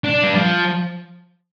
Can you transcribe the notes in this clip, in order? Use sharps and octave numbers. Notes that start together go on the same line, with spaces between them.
D4
G3
F3